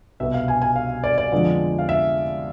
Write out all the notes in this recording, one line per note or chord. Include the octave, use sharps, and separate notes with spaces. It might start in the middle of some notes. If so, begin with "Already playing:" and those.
C2 B2 B3 E5
F5
G#5
G#5
F5
D5
D5
F2 D3 F3 G#3 B3
F5
E5